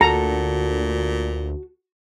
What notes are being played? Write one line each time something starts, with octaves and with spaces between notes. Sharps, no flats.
D2 A#2 F#4 A4 A#5